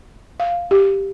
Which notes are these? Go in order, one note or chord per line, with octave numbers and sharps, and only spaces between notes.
F5
G4